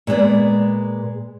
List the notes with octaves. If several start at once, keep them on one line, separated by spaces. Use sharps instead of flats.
A#2 G#3 B3 D5